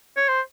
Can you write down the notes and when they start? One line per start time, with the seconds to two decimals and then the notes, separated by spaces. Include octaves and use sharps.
0.16 C#5
0.28 C5